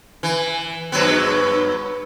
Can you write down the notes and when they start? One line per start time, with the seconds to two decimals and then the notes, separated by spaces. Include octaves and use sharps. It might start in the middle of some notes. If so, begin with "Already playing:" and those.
0.23 E3
0.92 G2 F#3 B3